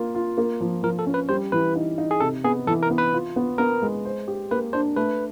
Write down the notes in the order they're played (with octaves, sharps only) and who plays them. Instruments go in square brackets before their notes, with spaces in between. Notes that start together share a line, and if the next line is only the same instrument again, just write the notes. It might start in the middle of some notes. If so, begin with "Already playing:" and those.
Already playing: [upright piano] A#3 F4
F4
A#3
F3
[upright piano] F3 [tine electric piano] A#4
[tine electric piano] A4
[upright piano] C#4
[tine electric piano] B4
[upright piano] G3 [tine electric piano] C5
[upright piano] E3 [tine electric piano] B4
[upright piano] D#4
D#4
[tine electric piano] G#4
[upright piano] C3 [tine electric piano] A4
[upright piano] B3 [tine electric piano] G#4
[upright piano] E3 [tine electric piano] A4
[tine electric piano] A#4
[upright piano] B3
[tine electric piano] B4
[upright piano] F4
B3
[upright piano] B3 [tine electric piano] A#4
[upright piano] G#3
C5
G4
[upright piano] A#3 [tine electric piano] B4
[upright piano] D4 [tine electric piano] C5
[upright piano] A3 [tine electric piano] B4